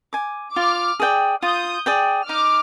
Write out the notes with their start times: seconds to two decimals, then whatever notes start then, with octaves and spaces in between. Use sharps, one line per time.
0.13 G#5 D6
0.56 F4 D6 F6
1.00 G#4 D5 G5
1.43 F4 D#6 G6
1.86 G#4 D5 G5
2.29 D#4 D6 F6